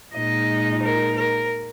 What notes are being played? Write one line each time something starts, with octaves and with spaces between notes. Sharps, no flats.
A#2 G#3 D#4 D#5
A#4
A#4